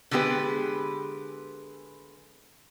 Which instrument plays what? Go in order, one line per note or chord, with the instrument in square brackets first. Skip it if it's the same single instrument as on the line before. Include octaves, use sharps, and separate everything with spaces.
[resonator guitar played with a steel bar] D3 G#3 B3 G4 B4